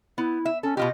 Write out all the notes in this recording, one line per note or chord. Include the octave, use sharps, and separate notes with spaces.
B3 E4
E5
C#4 A4
B2 F4 G4 D#5